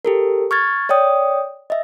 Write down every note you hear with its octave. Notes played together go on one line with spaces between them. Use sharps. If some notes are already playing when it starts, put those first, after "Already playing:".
G4 A4 A#4
C#6 F6 G#6 A6
C#5 D5 G5 D#6
D#5 E5